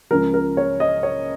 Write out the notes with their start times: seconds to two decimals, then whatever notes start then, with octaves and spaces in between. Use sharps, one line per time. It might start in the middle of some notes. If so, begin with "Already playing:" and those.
0.11 C#2 C#3 F3 A#4
0.34 A#4
0.57 C#5
0.80 D#5
1.03 C#5